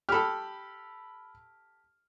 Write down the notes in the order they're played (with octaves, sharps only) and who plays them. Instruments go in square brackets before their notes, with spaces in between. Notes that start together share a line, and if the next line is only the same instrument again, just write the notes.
[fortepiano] G4 A4 [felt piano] B5 F6